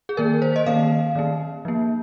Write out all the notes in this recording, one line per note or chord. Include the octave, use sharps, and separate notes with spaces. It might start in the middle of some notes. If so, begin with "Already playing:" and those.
G#4
D#3 A#3 A#4
C5
D#5
D#3 A#3 F5
D#3 A#3
F3 A#3